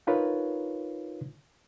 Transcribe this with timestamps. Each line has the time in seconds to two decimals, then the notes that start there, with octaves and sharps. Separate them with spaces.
0.07 D4 D#4 F4 A#4 B4 C#5